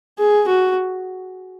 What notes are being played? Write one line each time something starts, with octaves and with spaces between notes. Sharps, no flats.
G#4
F#4